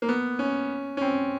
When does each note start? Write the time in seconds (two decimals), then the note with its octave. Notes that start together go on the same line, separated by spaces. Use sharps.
0.02 A#3
0.09 B3
0.39 C#4
0.97 C#4
1.01 C4